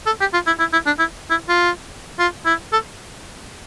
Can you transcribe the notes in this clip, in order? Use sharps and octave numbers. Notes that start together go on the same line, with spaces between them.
A4
G4
F4
E4
E4
E4
D4
E4
E4
F4
F4
E4
A4